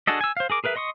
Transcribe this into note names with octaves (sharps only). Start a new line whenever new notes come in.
D4 F#4 G#4 A4 D#5
G#5 E6
C5 F5
G#4 A#4 D6
G#4 A#4 B4 E5
D#5 C6 C#6 D#6